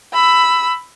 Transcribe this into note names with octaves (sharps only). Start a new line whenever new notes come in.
B5 E6